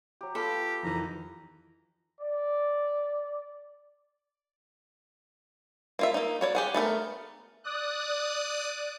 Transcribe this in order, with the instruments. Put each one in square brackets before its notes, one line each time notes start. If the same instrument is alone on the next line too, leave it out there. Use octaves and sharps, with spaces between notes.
[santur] F#3 G4
[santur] B3 F4 F5 [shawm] G4 [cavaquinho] A4
[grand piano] F2 D#3 E3 [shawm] A#5
[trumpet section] D5
[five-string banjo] A#3 F4 E5
A#3 D#4
F#4 C#5 D5
G4 G#4 F#5
A3 B3 A4 A#4
[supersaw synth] D5 D#6 F#6